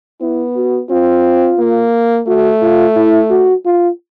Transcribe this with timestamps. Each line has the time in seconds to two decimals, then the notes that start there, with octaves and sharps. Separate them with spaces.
0.21 B3 E4
0.56 F#4
0.90 C4 F4
1.59 A#3
2.27 A3 F#4
2.62 F4
2.96 E4
3.31 F#4
3.65 F4